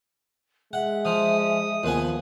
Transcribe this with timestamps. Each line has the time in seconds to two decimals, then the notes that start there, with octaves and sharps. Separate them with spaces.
0.73 G#3 E5 F#5
1.05 F3 D#6
1.83 D#2 F3 B3 G#5